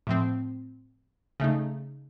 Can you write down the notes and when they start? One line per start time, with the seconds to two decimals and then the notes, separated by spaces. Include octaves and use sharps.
0.07 A2 F3 C4
1.40 C#3 A3 D#4